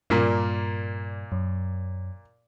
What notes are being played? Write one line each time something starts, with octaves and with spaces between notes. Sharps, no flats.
G2 A#2 A#3
F#2